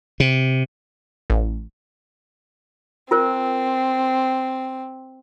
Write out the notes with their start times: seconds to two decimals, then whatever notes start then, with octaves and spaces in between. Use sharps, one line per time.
0.20 C3
1.30 A1
3.11 C4 F4 A#4 C5